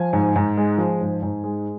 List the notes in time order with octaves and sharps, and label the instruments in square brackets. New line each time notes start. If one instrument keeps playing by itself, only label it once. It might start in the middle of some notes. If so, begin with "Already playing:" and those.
Already playing: [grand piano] F3 G#5
G#2
G#2
G#3
F3
G#2
G#2
G#3